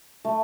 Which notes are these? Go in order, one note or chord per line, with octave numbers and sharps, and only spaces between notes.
A3